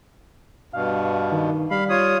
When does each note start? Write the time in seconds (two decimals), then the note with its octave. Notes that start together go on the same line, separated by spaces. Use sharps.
0.73 G2 B2 F5
1.32 D#3
1.71 G3 F5 B5
1.90 F4 C#5 D#6